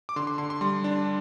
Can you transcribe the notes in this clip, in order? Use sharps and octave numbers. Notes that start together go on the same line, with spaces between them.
D6
D3 C6
C6
D3 C6
C6
G3 C6
D4